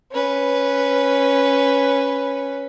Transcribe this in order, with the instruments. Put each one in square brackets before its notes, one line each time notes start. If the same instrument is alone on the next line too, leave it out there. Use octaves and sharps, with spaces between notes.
[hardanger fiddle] C#4 B4